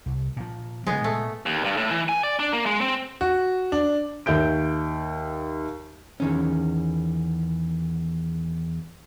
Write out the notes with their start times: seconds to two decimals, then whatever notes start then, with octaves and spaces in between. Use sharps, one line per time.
0.06 C2
0.36 A#2 F3
0.87 C#3 F3 F#3 G#3 B3
1.04 A#2 A3
1.46 D#2
1.65 G2
1.77 A2
1.91 E3
2.09 G#5
2.23 D5
2.39 D4
2.52 A#3
2.66 G#3
2.81 C4
3.21 F#4
3.72 D4
4.26 D#2 E5 G6 D7
6.20 E2 D#3 C#4